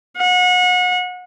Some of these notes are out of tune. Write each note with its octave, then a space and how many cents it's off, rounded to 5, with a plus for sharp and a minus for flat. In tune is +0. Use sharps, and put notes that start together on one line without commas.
F#5 -30